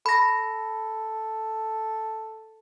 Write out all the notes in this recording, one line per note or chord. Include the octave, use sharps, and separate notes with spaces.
A4 B5 A#6